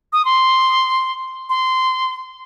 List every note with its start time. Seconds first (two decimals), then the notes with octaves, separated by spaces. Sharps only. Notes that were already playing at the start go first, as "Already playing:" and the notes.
0.13 D#6
0.25 C6
1.49 C6